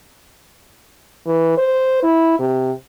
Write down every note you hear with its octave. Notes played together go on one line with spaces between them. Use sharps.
E3
C5
E4
C3